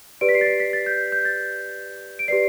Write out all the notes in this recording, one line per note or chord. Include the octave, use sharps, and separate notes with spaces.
G4 B4 D5 D7
B6
C7
A6
B6
B6
A6
G6
G6
A6
D7
G4 B4 D5 C7